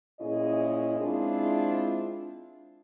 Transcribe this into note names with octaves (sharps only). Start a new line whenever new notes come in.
A#2 C#4 E4 G#4 D#5
G#3 C4 D4 E4 F4